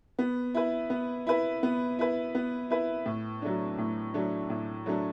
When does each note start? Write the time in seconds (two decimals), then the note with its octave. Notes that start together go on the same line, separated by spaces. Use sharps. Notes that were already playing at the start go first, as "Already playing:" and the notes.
0.19 B3
0.54 E4 B4
0.90 B3
1.27 E4 B4
1.63 B3
1.99 E4 B4
2.35 B3
2.70 E4 B4
3.06 A2
3.42 F#3 A3 D4
3.78 A2
4.14 F#3 A3 D4
4.50 A2
4.86 F#3 A3 D4